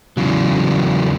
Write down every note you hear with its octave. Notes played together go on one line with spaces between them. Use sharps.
E2 G#2 C#3 E3 F#3